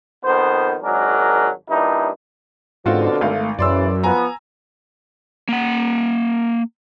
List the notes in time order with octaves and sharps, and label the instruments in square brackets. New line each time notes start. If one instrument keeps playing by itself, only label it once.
[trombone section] F2 D#3 B3 C5
G#1 F#3 G#3 D4 A#4
G2 A#2 D#4 E4
[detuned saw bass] G#2 [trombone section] B2 D3 [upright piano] C4 F4 F#4
[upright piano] G#1 F5 [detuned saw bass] A3
[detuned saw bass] F#2 [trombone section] C#3 E3 [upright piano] D5 C6 E6
[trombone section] F3 B3 [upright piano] G#5 A#5
[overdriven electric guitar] A#3 F#5